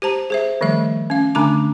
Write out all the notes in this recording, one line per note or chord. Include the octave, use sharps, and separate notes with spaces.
G4 C5 A5 A#5
G#4 C5 E5
D#3 F3 G3 A3 E5
C#4 F5
D3 A3 D4 G#5 B5 D6